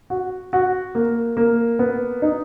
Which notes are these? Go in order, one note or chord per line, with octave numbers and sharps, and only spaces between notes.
F#4
F#4
A#3
A#3
B3
D#4